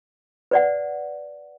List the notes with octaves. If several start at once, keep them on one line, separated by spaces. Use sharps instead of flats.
B4 D5 F#5